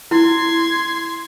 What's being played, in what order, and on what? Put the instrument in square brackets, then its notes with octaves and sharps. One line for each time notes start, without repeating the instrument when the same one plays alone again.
[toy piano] E4 [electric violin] C6 G#6